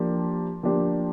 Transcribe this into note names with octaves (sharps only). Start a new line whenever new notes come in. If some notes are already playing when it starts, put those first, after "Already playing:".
Already playing: F3 A#3 D4 G4
F3 A#3 D4 G4